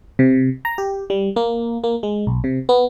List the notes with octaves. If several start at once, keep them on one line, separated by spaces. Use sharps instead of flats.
C3
A#5
G4
G3
A#3
A#3
G#3
B1
C3
B3